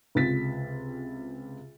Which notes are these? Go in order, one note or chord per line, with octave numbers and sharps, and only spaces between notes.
C#2 C3 F4 A6 B6